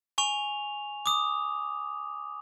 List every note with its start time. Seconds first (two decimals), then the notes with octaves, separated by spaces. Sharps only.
0.18 G#5 C#6 F7
1.06 D6 D#6